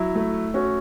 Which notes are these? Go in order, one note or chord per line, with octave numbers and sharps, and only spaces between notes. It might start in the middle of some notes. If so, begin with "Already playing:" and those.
Already playing: F#3 E4
A3
C#4 F#4